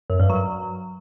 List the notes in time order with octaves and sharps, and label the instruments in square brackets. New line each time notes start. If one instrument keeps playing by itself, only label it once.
[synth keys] F#2
G2
F#3